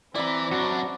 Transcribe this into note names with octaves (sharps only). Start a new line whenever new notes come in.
E3 C4 E4 D5 A#5 B5
F#2 D4 F#4